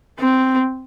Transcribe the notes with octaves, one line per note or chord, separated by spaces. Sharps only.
C4